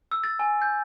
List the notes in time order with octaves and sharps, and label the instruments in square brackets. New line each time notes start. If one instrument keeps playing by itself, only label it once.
[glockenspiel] E6
A6
G#5
G6